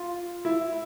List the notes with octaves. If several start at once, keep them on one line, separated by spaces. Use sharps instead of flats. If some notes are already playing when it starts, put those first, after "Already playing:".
Already playing: F4
E4